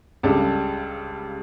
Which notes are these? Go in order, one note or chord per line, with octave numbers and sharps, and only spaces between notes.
C#2 C#3 G3 D4 A4